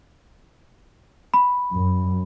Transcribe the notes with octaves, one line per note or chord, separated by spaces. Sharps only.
B5
F#2